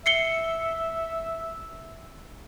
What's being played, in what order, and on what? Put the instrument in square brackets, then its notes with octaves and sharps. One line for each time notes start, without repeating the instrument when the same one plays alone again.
[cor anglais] E5 [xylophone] C7 C#7 G7